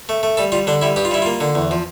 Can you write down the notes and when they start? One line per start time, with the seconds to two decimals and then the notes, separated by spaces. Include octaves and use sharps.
0.09 A3
0.23 A3
0.37 G3 A4
0.52 G3 F4
0.67 D3 D4
0.82 G3 E4
0.96 G2 G4
1.05 F4
1.11 G3 E4
1.22 A#3 F4
1.41 D3
1.55 E2
1.71 F3